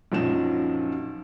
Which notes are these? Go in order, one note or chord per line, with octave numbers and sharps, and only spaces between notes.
A#1 F#2 F3 F#3 D#4 E7